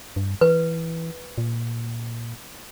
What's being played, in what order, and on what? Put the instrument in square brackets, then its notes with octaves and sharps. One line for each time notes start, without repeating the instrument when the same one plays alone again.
[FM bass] G2
[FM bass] E3 [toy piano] B4
[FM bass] A#2